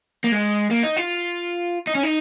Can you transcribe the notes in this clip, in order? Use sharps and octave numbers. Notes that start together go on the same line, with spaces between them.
A#3
G#3
A#3
D#4
F4
D#4
C#4
D#4